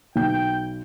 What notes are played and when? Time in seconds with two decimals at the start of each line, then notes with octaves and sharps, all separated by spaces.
0.16 B1 G5 G6